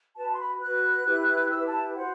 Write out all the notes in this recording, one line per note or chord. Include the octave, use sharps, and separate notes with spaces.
F#4 B4 A5
C6
B5
F#4 B4 F#6
E4 G4 B4
E4 G4 B4 E6
A5
F#4 C5 F#5